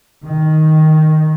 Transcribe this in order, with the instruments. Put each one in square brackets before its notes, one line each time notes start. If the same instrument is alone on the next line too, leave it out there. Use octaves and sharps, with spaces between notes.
[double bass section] D#3